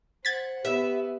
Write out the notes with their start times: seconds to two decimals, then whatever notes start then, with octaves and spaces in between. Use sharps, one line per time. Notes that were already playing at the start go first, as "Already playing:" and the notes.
0.25 C5 F#5 G#6 A6 B6
0.65 B3 G4 E5